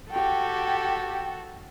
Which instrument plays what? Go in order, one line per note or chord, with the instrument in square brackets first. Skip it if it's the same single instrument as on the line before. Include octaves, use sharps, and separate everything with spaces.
[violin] F#4 A4 [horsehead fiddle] G4 G5